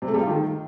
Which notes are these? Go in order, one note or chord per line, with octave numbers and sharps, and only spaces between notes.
C3
A3
G3
F4
D#3